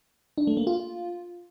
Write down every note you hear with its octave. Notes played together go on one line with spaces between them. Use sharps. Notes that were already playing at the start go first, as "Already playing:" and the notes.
D4
A3
A#3
F4